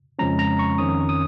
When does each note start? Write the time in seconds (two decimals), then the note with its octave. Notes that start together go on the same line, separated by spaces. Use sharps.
0.19 F2 C#3 F3 G#3 C#4 A#5
0.39 A#5
0.59 C#6
0.78 F2 D#3 C#4 D#6
1.09 D#6